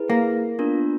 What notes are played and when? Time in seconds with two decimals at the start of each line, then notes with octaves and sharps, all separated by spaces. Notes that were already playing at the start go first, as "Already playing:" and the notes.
Already playing: E4 G#4 B4
0.10 A#3
0.59 B3 D4 F4 A#4